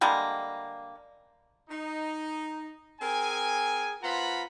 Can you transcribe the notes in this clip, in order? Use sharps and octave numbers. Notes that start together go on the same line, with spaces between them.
D3 G3 G#3 A#3
D#4
C4 G#4 A#4 G#5
B3 F4 C5 F#5 A#5 B5